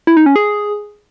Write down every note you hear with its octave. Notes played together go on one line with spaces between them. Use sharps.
E4
D#4
C#4
G#4